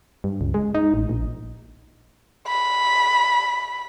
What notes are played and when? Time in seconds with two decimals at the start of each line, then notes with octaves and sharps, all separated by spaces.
0.24 G2
0.41 C#2
0.54 G#3
0.75 D#4
0.94 A1
1.09 A#1
2.47 B5